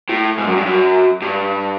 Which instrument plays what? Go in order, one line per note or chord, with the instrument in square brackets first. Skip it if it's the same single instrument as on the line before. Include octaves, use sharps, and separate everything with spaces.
[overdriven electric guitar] A2
G#2
F#2
G2
F#2
G2